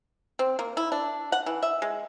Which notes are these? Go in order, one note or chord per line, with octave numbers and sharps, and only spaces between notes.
C4
A#3
E4
D4
F#5
E3
E5
G#3